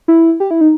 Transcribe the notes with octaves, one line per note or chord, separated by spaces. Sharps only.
E4
G4
E4
D#4